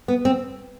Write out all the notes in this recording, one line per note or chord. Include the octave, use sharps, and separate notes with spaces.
B3
C4